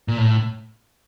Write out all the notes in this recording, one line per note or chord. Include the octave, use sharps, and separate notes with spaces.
A#2
A2